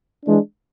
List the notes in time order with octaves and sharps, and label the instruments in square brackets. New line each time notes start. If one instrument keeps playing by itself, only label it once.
[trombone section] E3 G#3 D4